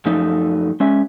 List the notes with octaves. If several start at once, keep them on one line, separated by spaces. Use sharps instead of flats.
F#2 F3 A3 D#4
G#3 C#4 E5